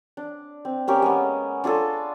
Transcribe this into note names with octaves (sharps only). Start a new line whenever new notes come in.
D4
C4
A#3 C#4 G4 A#4
G#3 A#3 B3
D4 F4 G#4 A4